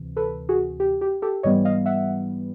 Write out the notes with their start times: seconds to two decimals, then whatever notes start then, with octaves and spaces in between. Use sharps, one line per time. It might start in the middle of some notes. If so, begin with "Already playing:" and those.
Already playing: D2 C3 E3
0.17 A4 B4
0.49 F#4 G#4
0.80 G4
1.01 G4
1.22 G4 A4
1.43 G#2 E3 G3 B3 C#5 D#5
1.65 D#5 F5
1.86 E5 F#5